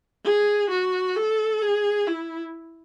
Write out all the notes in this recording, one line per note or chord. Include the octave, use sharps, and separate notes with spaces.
G#4
F#4
A4
G#4
E4